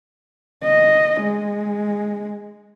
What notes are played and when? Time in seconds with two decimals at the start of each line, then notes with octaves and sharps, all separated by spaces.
0.63 D#5
1.20 G#3